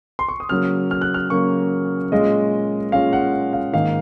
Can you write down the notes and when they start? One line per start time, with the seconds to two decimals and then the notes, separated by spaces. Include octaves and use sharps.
0.19 C6
0.28 C#6
0.40 D#6
0.49 C#3 F#3 A#3 F6
0.91 F6
1.01 F#6
1.14 F6
1.30 C#3 F#3 A#3 C#6
2.12 A#2 G#3 C#4 F4 D#5
2.92 A#2 G#3 C#4 F4 F5
3.13 F#5
3.53 F5
3.73 G#2 D#3 A#3 D#4 F5